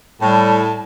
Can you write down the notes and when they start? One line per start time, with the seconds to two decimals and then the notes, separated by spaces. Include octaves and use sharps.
0.22 A2 G3 A5